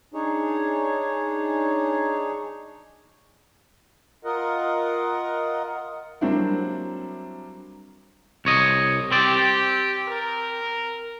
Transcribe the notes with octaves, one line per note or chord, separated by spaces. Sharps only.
D4 D#4 G#4 C#5
F4 A#4 D#5 F#5
F#3 G3 A#3 C4 D4 E4
C2 C#5 D#5
C4 G4 D5
A#4